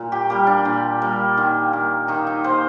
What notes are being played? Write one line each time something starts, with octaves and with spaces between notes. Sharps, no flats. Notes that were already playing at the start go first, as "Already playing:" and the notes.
Already playing: A#2
G4
G3 A#3 G4
D4
A#2
G3 A#3
D#3
A#3
D#3 D#4
D#4
A#3 C5